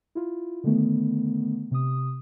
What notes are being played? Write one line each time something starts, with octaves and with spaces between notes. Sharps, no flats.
E4 F4
D3 D#3 A3 B3
C3 D#6